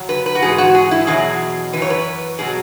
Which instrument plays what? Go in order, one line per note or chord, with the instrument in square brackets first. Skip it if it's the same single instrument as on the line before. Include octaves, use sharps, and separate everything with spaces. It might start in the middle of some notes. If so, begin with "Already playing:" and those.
Already playing: [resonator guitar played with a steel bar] F#2 C#3 F#3
B4
B4
F#4
G#2 E3 G#4
F#4
G#4
E4
E2 B2 F#3 G#4
E3 B4
F#2
C#5
B4
B2 F#3 G#4